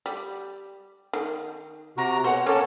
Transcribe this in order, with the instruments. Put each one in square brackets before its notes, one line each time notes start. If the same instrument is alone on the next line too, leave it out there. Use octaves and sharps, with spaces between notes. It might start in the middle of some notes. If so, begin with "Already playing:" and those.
[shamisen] G3
D#3
[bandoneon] C3 F#4 [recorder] A#5
[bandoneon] B2 [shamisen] C5 C#5 [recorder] F#5
[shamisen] A#3 [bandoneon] C#4 [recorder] A4